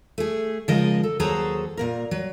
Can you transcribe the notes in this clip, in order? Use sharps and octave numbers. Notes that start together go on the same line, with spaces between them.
A3 G#4
C#3 F3 G#3 A#4 D#5
A4
D#2 F#3 G#4 A4 C5 A#5
A#2 A#3 A#4
F#3